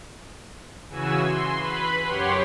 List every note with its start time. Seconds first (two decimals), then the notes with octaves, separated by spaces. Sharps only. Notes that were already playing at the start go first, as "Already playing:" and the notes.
0.89 C#3 E3 F#4 G#5 E6
1.20 C6
1.56 B4 B5
2.06 F#2 G4 C#5 F#5 C6